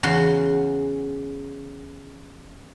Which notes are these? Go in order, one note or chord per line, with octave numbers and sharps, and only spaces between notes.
E2 C#3 F#4 F#5 C6